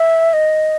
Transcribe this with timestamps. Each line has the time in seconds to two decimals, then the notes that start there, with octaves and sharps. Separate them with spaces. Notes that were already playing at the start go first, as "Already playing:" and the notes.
Already playing: E5
0.33 D#5